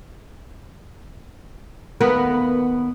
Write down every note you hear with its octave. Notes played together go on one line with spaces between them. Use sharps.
D#2 B3 A#4